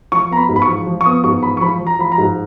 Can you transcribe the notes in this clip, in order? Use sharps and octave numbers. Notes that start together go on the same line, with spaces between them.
F3 C#6
B3 A#5
B5
G#2
B5
C#6
F3
F3
C#6
B3 D#6
G#2 C#6
F3 B5
C#6
F3 B5
F3
A#5
F3 B5
A#5
G#2